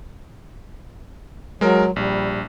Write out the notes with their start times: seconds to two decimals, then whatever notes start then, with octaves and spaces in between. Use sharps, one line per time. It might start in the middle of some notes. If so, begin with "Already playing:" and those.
1.61 F#3 G#3 A#4
1.96 A#1 G3